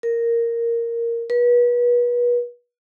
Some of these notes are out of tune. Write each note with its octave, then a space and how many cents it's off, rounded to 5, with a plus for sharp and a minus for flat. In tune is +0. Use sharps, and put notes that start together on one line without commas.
A#4 -5
B4 -35